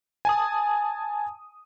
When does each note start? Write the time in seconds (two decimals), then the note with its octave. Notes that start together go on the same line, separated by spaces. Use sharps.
0.25 G#5 A5 D#6